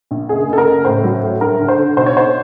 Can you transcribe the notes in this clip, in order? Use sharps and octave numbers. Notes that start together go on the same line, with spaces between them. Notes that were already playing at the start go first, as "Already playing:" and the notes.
A#1
F#1 G#4
F#1 A4
A#4
F#1
A2 C5
F#3
A2
G2 A#4
D3
C5
D3
B1 C5
C#5
B1 C5